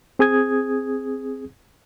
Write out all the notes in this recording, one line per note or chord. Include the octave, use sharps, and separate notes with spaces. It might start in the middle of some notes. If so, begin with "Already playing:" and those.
C4 G#4 D#6 G#6